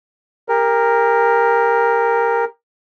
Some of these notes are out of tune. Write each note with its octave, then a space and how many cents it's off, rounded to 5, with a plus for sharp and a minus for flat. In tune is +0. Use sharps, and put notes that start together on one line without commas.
G4 +35 A#4 +0